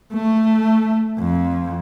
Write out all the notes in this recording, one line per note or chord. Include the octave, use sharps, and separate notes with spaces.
A3
F2